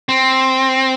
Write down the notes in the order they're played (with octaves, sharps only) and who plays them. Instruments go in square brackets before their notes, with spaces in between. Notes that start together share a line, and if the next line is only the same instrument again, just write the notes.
[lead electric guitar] C4